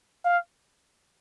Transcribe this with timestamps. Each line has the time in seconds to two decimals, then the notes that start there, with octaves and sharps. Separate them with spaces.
0.25 F5